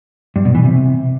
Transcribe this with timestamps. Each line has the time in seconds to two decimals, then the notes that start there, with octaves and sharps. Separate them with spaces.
0.36 G2
0.45 B2
0.55 E3
0.64 C3